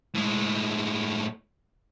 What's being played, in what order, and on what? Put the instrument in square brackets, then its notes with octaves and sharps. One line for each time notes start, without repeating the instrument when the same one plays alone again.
[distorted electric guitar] A2 G#3